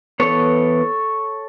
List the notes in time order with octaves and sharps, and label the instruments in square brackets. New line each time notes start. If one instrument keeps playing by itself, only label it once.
[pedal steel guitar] E3 B3 A4 C#5